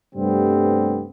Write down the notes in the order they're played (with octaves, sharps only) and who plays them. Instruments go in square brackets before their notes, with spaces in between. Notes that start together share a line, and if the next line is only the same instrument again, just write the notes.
[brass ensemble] G2 C3 G3 A3 B3 C4